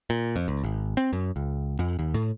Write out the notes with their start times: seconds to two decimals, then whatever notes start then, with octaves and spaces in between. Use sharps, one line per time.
0.10 A#2
0.36 F2
0.48 C#2
0.64 G#1
0.97 C4
1.13 F#2
1.36 C#2
1.79 F2
1.99 D#2
2.14 A2